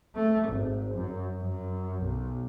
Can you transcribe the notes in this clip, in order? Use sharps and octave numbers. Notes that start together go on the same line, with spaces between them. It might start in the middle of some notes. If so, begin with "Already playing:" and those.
A3
G#1
F#2
F#2
B1